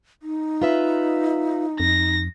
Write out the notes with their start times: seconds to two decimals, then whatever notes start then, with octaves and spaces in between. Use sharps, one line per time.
0.23 D#4
0.62 F4 B4 E5
1.80 F2 A#6